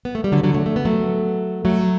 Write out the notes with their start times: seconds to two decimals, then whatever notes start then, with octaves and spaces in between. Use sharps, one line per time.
0.05 B3
0.15 A3
0.24 G3
0.32 D3 F#3
0.43 D3 F#3
0.54 F#3 A3
0.66 A3
0.76 B3
0.85 F#3 A3
1.65 F#3 A3